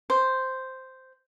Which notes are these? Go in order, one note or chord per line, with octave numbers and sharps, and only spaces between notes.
C5